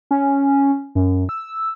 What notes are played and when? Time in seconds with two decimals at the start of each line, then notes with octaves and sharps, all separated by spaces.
0.11 C#4
0.95 F#2
1.29 E6